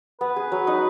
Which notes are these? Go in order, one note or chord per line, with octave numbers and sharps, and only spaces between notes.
B3 B4
G#4
F#3
D#4